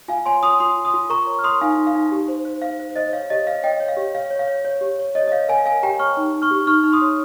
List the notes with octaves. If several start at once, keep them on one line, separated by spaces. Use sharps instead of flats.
F4 F5 G#5
C#5 G#5 C6
F4 C6 D#6
F4 C6 D#6
F4
C6 D#6
F4
A#4 A#5 C#6
C#5
F6
A#4 C6 D#6
D#4 F5 G#5
D#4
F5
D#4
G4
C5
C5
C5 F5
C5
C5 D#5
C#5 F5
G4 D#5
C#5 F5
C#5 D#5 G5
C#5
F5
G4
C#5 F5
C#5
F5
C#5
C#5
G4
C#5
C#5 D#5
D#5
C#5 F5
A#4 F5 G#5
A#4 F5 G#5
G4 G5 A#5
C#5 C#6 F6
D#4
D#4
C#6 F6
G4
D#4 C#6 F6
D#4
C6 D#6
C#5